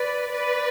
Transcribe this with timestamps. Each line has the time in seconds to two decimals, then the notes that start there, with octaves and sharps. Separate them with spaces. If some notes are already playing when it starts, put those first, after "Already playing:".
Already playing: B4 D5
0.29 B4 D5